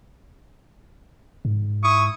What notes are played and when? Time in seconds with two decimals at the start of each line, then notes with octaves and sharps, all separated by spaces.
1.45 G#2
1.83 E4 C#6 D#6